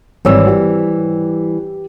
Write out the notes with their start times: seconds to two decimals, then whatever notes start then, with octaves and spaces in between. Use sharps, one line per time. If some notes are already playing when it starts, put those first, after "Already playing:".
0.25 G#1 E3 G3 C4 C#5 E6
0.47 G4